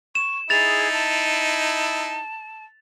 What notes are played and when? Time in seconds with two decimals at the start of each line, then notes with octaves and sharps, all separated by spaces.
0.15 C#6 E7
0.50 D#4 E4 G#4 A6 F7
0.92 A5